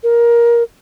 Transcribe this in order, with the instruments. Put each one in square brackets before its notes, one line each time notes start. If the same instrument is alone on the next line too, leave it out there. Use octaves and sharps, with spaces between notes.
[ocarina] A#4